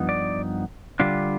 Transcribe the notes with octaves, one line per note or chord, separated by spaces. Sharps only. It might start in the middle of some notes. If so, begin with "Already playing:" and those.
Already playing: G2 F3 B3 D#4
D5
D3 G3 D4 F4